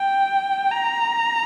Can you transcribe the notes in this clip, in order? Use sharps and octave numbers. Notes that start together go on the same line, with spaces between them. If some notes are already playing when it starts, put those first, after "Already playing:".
Already playing: G5
A#5